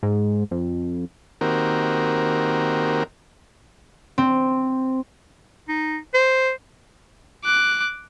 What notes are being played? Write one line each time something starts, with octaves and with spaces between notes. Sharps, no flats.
G#2
F2
D#3 A#3 C4 F#4 G4 A#4
C4
D#4
C5
D6 F#6